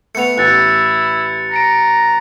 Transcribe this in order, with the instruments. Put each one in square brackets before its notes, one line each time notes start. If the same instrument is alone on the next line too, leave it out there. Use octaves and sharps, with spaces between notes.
[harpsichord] A3 B3 [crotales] C#7 F7
[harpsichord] A1 [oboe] E4 [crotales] F#6 A6 C#7
[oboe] A#5 [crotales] A#6 C#7 D7